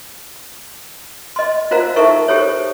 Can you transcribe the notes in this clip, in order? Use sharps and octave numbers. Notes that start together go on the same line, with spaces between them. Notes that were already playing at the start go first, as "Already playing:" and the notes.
D#5 C6
F4 A#4 C5 F5 A#5
D#4 E4 A4 A#4 E5 C#6
G4 A4 C5 C#5